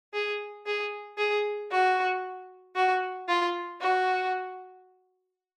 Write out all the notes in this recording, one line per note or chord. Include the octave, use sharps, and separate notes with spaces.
G#4
G#4
G#4
F#4
F#4
F4
F#4